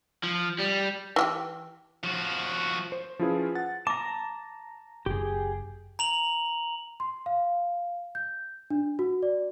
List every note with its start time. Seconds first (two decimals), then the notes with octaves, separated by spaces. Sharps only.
0.23 F3
0.59 G3
1.16 E3 F4 G4
2.04 F3 F#4
2.92 C5
3.19 F3 C#4 E4 F4 G#4 B4
3.55 F#5 A6
3.87 A5 A#5 D6
5.06 F#1 G4 G#4
5.99 A#5 F7 F#7
7.00 C6
7.26 F5
8.15 G6
8.70 D4
8.99 F#4
9.23 D5